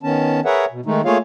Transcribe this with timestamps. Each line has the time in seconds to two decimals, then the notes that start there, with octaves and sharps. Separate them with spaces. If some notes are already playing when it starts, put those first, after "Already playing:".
0.03 D#3 B3 C#4 A5
0.45 G#4 A#4 B4 C#5 E5 F#5
0.72 B2
0.86 D#3 G#3 A3 D#4
1.05 A3 A#3 F4 G#4 C#5 F5